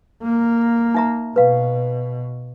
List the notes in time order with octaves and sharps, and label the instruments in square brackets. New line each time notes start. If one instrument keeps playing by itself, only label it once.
[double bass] A#3
[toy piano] D#4 E5 A#5
[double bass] B2 [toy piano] B4 F5